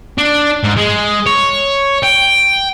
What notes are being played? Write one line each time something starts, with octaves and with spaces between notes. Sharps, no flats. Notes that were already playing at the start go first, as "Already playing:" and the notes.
D4
G#2
G#3
C#5
G5